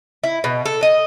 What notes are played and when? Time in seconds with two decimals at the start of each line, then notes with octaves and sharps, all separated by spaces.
0.23 E4
0.44 B2
0.66 A4
0.83 D#5